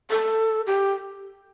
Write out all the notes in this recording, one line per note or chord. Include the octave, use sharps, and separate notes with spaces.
A4
G4